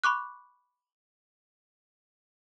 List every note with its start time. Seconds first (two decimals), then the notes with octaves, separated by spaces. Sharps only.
0.04 B5 C#6 D6 F#6